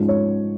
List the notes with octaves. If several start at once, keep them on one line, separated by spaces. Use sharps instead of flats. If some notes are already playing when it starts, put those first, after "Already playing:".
Already playing: G#2 F3 G#3 C#4
C#5